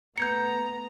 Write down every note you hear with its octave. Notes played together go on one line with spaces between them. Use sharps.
A3 B3 A#5 G6 G#6 C#7